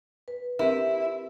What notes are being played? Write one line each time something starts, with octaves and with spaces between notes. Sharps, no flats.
B4
C4 E4 G4 A#4